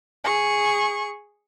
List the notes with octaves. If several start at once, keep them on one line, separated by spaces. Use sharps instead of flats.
G#4 C#6